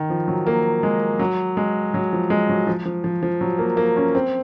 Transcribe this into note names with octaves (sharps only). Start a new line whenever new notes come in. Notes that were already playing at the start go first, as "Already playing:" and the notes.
Already playing: D#3
F3
F#3
A#3
G#3
F#3
G#3
F#3
F3
G#3
F#3
F3
F3
F3
F3
F#3
A#3
A#3
C#4
C4